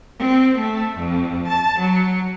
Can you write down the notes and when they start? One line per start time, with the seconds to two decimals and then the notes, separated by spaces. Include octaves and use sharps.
0.18 C4
0.58 A3
0.97 F2
1.47 A5
1.78 F#3